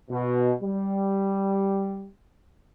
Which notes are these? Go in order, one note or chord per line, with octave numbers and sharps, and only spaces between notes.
B2
G3